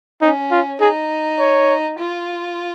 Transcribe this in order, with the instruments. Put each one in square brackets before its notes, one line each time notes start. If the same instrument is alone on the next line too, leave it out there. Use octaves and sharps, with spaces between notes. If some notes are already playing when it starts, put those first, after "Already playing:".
[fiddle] C#4 [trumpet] D#4
[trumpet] F4
[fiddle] D#4 [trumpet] G#4
[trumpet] C#5
[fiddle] F4